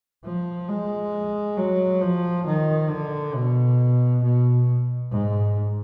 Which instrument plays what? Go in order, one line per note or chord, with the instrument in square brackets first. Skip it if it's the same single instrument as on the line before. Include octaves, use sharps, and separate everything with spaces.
[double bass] F3
G#3
F#3
F3
D#3
D3
B2
B2
G#2